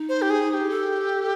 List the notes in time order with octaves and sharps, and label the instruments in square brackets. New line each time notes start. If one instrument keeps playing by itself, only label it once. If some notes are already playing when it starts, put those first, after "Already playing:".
Already playing: [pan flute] D#4
[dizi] C5
G4
G#4
G#4
G4
[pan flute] A4